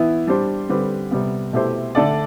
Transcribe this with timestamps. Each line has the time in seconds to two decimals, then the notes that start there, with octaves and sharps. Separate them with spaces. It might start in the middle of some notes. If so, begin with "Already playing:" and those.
Already playing: E3 B3 E4
0.27 G3 D4 G4 C5
0.69 D3 G3 C4 G4 B4
1.11 C3 G3 B3
1.53 B2 A3 E4 G4 C5
1.95 D3 A3 D4 A4 D5